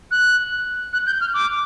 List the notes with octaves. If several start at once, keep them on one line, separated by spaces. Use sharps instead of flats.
F#6
F#6
G6
F6
D6